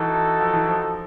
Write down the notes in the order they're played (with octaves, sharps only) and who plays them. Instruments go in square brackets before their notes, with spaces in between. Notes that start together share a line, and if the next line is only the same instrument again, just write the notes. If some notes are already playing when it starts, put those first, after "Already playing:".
Already playing: [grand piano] E3 [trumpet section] D#4 F#4 A4
[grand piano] F3
E3
F3